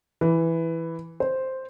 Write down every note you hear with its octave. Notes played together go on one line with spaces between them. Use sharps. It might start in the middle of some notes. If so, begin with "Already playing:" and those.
E3
C5